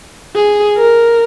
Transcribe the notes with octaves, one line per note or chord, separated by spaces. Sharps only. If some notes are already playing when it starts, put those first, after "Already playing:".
G#4
A#4